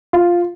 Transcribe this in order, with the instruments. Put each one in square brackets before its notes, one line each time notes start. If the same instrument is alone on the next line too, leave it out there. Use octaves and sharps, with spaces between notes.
[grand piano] F4